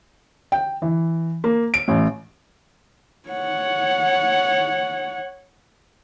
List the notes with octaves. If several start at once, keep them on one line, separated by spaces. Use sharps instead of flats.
G5
E3
A#3
D7
A1
C#5 F#5